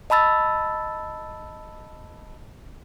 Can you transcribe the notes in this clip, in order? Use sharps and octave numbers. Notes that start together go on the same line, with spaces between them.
D#5 A5 B5 E6 A6